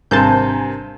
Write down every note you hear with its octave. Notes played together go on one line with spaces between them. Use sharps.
G#1 G2 C3 A#4 C5 G#5 A5 G6